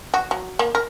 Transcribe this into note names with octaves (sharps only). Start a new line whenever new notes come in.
F#4
F#3
A#3
A#4